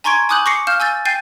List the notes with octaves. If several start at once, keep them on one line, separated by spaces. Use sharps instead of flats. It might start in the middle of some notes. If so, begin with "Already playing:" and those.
G#5 A#5 C6 C#6 G#6 D7
G#5 D6 D#6 F#6 G6 F#7
C#6 D6 A#6 C7 C#7
F5 F6 G6 E7
G#5 E6 G6 A6
G5 G6 A6 C7 D#7